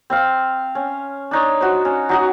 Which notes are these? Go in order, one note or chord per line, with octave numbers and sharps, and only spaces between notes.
C4 C5 F5
C#4
D4 D#4 C#5
F#4 C5
C#4
F#3 D#4 F#4